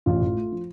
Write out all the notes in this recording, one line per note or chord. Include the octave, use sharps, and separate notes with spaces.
A1 F4
A2
A3
F3